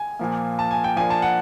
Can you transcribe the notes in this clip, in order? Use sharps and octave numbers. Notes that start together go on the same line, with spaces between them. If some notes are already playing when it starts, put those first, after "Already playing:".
Already playing: G#5
A#2 F3 A#3
A5
G#5
G5
F3 A#3 D4 G#5
A5
F#5